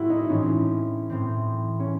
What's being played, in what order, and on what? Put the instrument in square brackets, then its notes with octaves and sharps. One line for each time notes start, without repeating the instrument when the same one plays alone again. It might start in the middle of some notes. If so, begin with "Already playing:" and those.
Already playing: [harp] A2 G#3 C4 [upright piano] E4 F#4
[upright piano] D#4
[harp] A2 E3 C4 [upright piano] C#4
[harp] A2 E3 C4
[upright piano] C#4